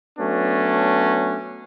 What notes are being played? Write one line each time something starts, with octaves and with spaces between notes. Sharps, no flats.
F#3 A3 B3 C#4 D4